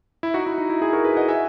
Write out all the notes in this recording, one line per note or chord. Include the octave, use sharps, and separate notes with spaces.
E4
D#4 F#4
E4
D#4
E4
E4 G#4
F#4 A#4
G#4 B4
D#5 F#5
E5 G#5